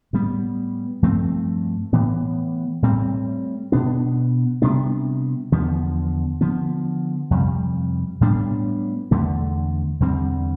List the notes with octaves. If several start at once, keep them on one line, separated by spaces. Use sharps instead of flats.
A2 G3 B3
G2 F3 A3 C4
A2 E3 B3
A2 G3 C4
B2 B3 D4
C3 G3 B3 D4
E2 D3 F3 B3
D3 F3 B3
F2 C3 G3
A2 G3 B3 D4
E2 D3 A3
E2 D3 G3 C4